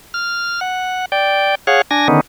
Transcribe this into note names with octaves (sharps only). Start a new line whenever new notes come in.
F6
F#5
D5 G5
G#4 C#5 F5 F#5
D4 G#5 A#6
D3 D#3 B3 C#4 D#4